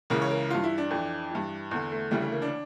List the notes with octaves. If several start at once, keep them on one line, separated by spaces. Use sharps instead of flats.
C#2 C#3 E3 A#4
C#5
A#4
G2 E3 F4
E4
D4
F2 E3
G2 E3
E2 D3
A3
D2 C#3 E3 G3
A3
A#3
D4